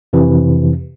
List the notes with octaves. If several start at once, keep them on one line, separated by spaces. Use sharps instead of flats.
F2 C3 E3